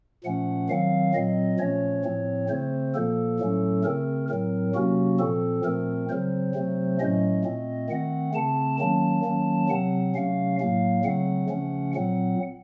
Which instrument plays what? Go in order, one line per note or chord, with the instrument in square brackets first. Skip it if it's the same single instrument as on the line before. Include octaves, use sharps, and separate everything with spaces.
[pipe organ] A#2 F3 A3 C#4 F#5
D#3 F#3 C4 F5
A#2 F#3 C4 D#5
A#2 F3 A3 C#4 C#5
A2 F3 C4
C#3 A3 C4 C5
A#2 F3 A#3 A4
A2 F#3 A3 C#4
C#3 A3 C4 A#4
A2 F#3 C4 A#4
C3 F#3 A#3 C#4 F#4
A#2 F3 C4 A4
A#2 F3 A3 C4 A#4
C#3 F#3 C4 C5
C3 F#3 A3 C4
A2 F#3 A3 C#4 D#5
A#2 A3 C4
D#3 A3 C4 F#5
C#3 A3 C4 A5
D#3 F#3 A#3 C#4 A5
D#3 F#3 A#3 C#4
C3 F#3 C4 F#5
C3 F#3 A3 C#4 F5
A2 F#3 A#3 F5
C#3 F#3 A3 C4 F#5
C#3 F3 A3 C#4
A#2 F#3 C4 F#5